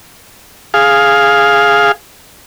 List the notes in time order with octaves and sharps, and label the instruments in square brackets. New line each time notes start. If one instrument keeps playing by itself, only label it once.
[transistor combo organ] G#4 F5